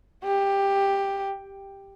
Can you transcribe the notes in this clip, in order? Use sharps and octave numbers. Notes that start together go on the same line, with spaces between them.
G4